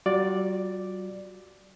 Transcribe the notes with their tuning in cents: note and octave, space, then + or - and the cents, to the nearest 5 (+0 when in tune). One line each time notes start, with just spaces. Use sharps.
G3 -45 F#4 -40 D5 +0